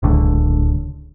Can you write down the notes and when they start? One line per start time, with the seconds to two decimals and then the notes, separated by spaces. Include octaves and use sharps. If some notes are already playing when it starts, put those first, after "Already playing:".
0.03 D1 C#2 D3